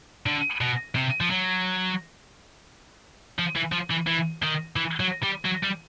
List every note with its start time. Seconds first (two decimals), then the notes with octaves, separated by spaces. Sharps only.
0.26 D3
0.61 B2
0.96 C3
1.21 F3
1.30 F#3
3.39 F3
3.56 E3
3.72 F3
3.91 E3
4.07 E3
4.43 D#3
4.76 E3
5.00 F#3
5.23 G3
5.45 F#3
5.64 G3